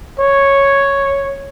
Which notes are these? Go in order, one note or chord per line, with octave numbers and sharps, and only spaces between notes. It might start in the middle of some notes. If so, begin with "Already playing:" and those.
C#5